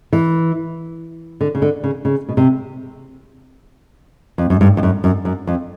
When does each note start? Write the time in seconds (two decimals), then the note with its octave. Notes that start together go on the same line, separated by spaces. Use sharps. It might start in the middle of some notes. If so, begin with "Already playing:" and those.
0.13 E3
1.41 D3
1.55 C#3
1.62 D3
1.84 C#3
2.05 C#3
2.29 B2
2.37 C3
4.38 F2
4.50 F#2
4.61 G2
4.77 F2
4.83 F#2
5.04 F#2
5.25 F#2
5.47 F2